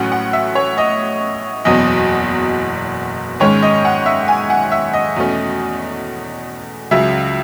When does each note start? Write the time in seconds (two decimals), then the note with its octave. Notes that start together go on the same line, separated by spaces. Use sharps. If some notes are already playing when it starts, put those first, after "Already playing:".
Already playing: A1 A2 F#3 C#4 F#5
0.12 F#5
0.33 E5
0.55 C#5
0.78 D#5
1.65 F#1 E2 B2 F#3 D#5
3.40 G#2 D#3 G#3 C#4 C#5
3.62 D#5
3.85 F#5
4.06 E5
4.28 G#5
4.50 F#5
4.72 E5
4.94 D#5
5.16 E2 B2 A3 C#4
6.91 C#2 C#3 F#3 E5